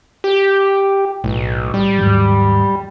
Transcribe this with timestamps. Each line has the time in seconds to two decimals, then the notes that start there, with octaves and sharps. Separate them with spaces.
0.24 G4
1.24 B1 A2
1.74 G3
1.99 D#2 G#2 F#3